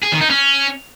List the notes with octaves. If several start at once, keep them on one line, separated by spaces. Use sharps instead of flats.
G#4
D#3
D#4
C#4